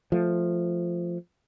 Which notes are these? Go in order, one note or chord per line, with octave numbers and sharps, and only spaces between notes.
F3 A3